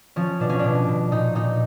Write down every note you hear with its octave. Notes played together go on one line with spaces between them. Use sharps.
F3 C#4
B2 D4
C#4
B2 D4
B2
A#2 D#4
A#2 D#4